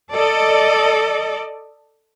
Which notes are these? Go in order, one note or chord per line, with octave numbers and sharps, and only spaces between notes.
A4 D5 D#5